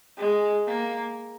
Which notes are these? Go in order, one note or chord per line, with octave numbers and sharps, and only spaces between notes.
G#3
A#3